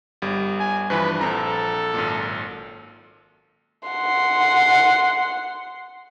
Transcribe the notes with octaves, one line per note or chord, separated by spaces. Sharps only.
G1 G3
G#5
G2 E3 F3 B4
A#1 C4 A4 A#5
G#1 F#2 A#2
F#5 C6